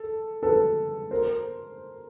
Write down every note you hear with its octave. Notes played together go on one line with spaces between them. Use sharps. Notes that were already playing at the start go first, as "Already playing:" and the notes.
Already playing: A4
A4 B4
A#4 C5